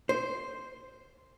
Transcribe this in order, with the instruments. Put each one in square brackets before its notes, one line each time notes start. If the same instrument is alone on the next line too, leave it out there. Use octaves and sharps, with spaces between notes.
[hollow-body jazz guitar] C5